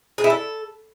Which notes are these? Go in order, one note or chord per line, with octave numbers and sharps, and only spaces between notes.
G#4
E4
A4